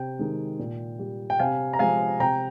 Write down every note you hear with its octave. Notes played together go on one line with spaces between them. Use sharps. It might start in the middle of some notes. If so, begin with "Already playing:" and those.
Already playing: C3 G5
D#3 G#3
A#2
G3
G5
C3 F5 G#5
A#5
F3 G#3 F5 G#5
C3 G5 A#5